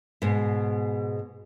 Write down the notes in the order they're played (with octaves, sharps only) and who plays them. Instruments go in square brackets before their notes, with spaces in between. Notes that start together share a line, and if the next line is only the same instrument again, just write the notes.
[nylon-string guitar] G#2 B2